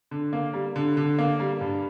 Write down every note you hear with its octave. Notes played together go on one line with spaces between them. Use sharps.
D3
A#3
G3
D3
D3
A#3
G3
G2